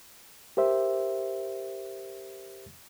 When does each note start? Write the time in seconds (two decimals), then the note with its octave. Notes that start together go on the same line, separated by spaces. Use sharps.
0.57 G4 A#4 C5 E5